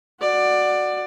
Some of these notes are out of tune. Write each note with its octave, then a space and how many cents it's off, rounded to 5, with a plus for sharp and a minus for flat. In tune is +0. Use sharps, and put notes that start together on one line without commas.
F#4 +0 D5 +15